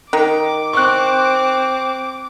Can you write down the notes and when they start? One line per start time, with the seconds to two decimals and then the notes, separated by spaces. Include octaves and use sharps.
0.13 D#3 D6
0.73 C4 C#6 F#6